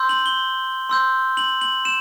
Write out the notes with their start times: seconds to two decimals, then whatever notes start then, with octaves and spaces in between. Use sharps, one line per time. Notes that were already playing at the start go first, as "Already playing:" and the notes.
Already playing: C6 E6 G6
0.09 F#7
0.26 G7
0.89 C6 E6 G6
1.37 F#7
1.61 F#7
1.85 E7